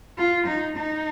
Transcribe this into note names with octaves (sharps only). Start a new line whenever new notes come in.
F4
D#4
D#4